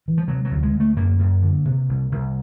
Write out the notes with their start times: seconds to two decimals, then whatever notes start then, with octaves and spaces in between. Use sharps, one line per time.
0.08 E3
0.18 F3
0.28 C3 F#3
0.45 F#3
0.51 D2
0.62 G#3
0.74 D2
0.80 A3
0.97 F#2 A#3
1.19 F#2
1.43 D3
1.65 C3
1.89 C2
2.12 C2